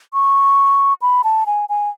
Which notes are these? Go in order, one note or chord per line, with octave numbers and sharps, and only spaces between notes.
C#6
B5
A5
G#5
G#5